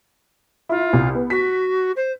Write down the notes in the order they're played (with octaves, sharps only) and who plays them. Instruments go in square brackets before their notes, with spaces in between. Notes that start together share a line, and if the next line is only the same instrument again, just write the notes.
[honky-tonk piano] E4 [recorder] F4
[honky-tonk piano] C2
B3
[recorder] F#4 [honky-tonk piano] B6
[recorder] C5